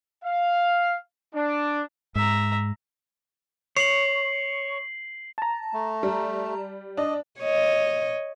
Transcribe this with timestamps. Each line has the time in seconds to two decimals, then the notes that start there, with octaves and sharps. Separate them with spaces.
0.24 F5
1.35 D4
2.15 G#2 E5 A#5
3.77 C#5 C7 F#7
5.38 A5 A#5
5.73 A3
6.03 G3
6.97 D4 D#5
7.40 C#5 D#5